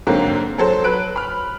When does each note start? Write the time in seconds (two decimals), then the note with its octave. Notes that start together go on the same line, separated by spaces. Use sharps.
0.07 G#2 D3 F#3 A#3 C4
0.58 F#3 A4 C5
0.84 F#3 B4 F#6 D7
1.16 B5 F6